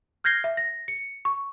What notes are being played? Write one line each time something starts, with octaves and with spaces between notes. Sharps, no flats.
F6 G6 G#6 A#6 C7 G7
E5
A#6
C#7
C#6